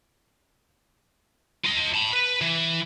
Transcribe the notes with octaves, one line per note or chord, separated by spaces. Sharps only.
F4 D#5
A5 B5
B4
E3